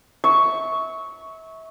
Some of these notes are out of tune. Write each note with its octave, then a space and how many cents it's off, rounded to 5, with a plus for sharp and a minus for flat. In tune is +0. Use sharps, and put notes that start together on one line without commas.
E5 -30 C#6 +0